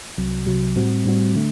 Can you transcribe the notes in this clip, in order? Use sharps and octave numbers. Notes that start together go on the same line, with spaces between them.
C2 C3 F#3
C2 C3 F#3
A2 G3 C4 F#4
A2 G3 C4 F#4
D3 A3